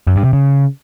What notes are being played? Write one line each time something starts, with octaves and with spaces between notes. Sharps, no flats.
F#2
G2
C3
C#3